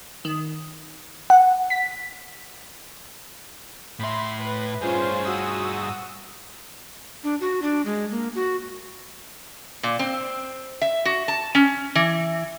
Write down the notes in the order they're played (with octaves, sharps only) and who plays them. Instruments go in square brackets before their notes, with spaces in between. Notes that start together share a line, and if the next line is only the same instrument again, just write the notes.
[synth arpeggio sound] D#3
F#5
B6
[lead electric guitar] A2 E5 [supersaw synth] B5 C6
[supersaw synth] B4
[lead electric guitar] G2 G#4 [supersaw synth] C#4 F4 C5
[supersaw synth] F#4 D#6 E6
[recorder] D4
F#4
D4
G#3
A#3
F#4
[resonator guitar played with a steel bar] A#2
C4
E5
F#4
A5
C#4
E3